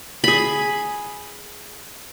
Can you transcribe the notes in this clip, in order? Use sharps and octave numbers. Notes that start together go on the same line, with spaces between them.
G#4 B5